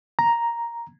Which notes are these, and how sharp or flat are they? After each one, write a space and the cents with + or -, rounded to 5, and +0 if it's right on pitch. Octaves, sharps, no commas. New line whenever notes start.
A#5 +5